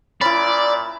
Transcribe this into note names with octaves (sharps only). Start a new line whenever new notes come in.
A#2 C#4 E4 D5 B5